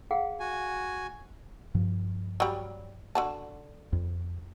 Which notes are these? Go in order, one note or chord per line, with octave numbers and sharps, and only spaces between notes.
G#4 F5 F#5
F#4 G#5
G2 F3
F#3 G3
D3 F#4 A5
F2